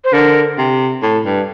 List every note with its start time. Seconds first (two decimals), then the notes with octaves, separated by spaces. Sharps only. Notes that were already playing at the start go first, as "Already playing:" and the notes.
0.04 C5
0.13 D3 A#4
0.58 C3
1.02 A2
1.25 G2